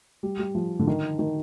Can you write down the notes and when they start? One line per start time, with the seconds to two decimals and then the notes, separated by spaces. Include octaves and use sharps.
0.23 G3
0.39 G3
0.55 F3
0.79 D3
0.87 D#3
1.19 D#3